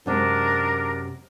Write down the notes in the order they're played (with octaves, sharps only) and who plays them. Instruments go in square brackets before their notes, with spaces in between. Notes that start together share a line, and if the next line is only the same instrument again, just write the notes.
[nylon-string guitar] F#2 C3 G#3 [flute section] D4 A#4